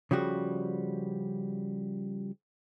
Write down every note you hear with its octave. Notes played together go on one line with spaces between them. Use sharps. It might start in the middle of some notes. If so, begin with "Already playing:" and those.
C#3 F3 G3 F#4